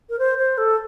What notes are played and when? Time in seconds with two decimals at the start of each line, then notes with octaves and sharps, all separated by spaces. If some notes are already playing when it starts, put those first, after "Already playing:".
0.10 A#4
0.19 C5
0.38 C5
0.58 A4